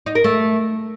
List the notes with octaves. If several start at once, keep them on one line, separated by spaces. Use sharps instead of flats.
D#4
A#4
A3